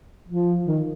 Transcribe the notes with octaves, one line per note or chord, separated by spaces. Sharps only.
F3
D#3